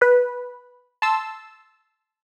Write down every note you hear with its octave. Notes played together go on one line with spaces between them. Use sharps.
B4 B5
A5 C6 E6